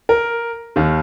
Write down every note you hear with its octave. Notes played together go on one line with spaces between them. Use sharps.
A#4
D#2 D#3